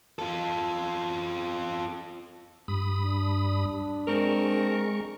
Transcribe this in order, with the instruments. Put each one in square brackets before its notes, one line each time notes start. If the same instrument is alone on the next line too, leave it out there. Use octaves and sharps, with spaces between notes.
[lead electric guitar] F4 A4
[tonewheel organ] G2 B5 D#6
[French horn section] D4
[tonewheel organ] G#3 C#6 [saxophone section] C4 A#4